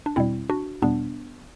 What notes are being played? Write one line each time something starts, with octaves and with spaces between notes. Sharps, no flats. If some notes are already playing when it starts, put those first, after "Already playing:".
D4
E2 B2 G3 C4 E4
D4 F#4
E2 B2 G3 B3 D4